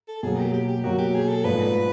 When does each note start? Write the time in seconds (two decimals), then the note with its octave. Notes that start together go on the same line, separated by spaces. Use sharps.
0.08 A4
0.23 B2 F#3 A#3 G#4
0.38 G4
0.54 G4
0.69 G4
0.83 B2 F#3 A#3 F#4
0.98 G4
1.14 G#4
1.29 A4
1.44 G#2 F3 A3 D4 B4